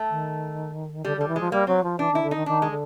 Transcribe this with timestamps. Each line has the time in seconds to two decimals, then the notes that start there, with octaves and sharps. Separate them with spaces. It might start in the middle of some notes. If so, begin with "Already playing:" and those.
Already playing: A3
0.10 D#3
1.05 D3 G3
1.16 D3 G3
1.28 E3
1.36 F3 G#3
1.52 G3 A#3
1.67 F#3 C4
1.83 F3
1.99 E3 D4
2.11 D#3 E4
2.22 D3
2.31 D#3 D#4
2.46 D#3 D4
2.62 G#3
2.70 D3